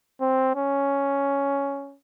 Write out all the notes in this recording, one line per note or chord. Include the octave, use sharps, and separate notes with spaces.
C4
C#4